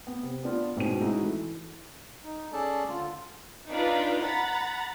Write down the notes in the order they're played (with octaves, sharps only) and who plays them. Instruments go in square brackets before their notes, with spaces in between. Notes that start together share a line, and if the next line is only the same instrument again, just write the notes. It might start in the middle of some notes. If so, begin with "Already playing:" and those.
[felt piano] B3
C3
B3 D4 F4
A1 G#2 B2 C#4 G5 D#7
G#3 D#4 E4 F#4
E3 A4
[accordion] D#4
C#4 G#4 A4 D5 A5
D3 F4
[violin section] D4 D#4 F4 B4
F#5 A#5 B5 A6